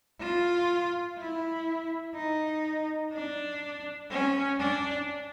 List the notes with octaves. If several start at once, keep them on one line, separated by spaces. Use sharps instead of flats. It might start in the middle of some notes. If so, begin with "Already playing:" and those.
F4
E4
D#4
D4
C#4
D4